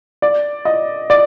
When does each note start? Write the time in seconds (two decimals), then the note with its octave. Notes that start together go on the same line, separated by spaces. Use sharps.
0.22 D5
0.65 D#5
1.10 D5